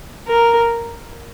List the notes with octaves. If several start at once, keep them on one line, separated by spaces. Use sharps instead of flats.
A#4